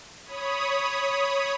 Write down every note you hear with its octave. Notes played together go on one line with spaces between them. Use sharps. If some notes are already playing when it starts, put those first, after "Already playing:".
C#5 B5 D#6